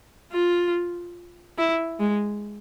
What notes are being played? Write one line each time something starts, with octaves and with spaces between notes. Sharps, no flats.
F4
E4
G#3